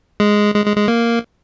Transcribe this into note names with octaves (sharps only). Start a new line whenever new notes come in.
G#3
G#3
G#3
G#3
A#3